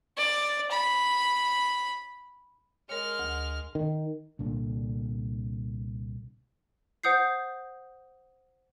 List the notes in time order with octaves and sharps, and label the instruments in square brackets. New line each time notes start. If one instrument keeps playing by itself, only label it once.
[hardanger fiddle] D5
B5
[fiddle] G#3 F6 [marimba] A#4 C#5
[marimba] D2
[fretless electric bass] D#3
C2 A#2 D3 D4
[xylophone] C5 F#5 D#6 G6 C7